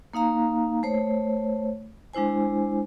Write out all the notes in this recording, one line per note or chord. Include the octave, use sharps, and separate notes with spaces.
A#3 D#4 F5 A#5
A3 C5 C#5
G#3 D4 E4 C5 G#5